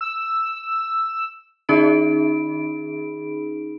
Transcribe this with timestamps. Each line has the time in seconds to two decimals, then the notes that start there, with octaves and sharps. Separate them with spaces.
0.01 E6
1.69 D#3 C#4 D#4 G#4 B5 D7